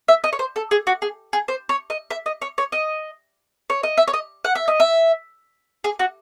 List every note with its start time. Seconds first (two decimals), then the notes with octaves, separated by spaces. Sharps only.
0.08 E5
0.24 D#5
0.33 C#5
0.39 C5
0.56 A4
0.71 G#4
0.87 F#4
1.02 G#4
1.33 G#4
1.48 C5
1.69 C#5
1.90 D#5
2.10 E5
2.26 D#5
2.42 C#5
2.58 C#5
2.72 D#5
3.70 C#5
3.83 D#5
3.98 E5
4.08 C#5
4.14 D#5
4.45 F#5
4.55 E5
4.68 D#5
4.80 E5
5.84 G#4
5.99 F#4